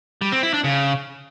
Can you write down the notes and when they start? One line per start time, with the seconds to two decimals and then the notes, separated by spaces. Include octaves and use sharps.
0.21 G3
0.32 C4
0.43 E4
0.53 D4
0.64 C#3